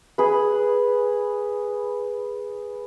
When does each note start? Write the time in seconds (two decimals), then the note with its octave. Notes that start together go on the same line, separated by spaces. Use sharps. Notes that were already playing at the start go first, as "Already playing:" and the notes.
0.18 G#4 B4